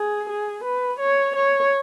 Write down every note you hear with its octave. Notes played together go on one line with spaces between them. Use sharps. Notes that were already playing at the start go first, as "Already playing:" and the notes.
Already playing: G#4
G#4
B4
C#5
C#5